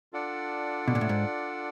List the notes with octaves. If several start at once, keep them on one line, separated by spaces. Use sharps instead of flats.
D4 F4 A4 D5 F#5
B2
A#2
A2
G#2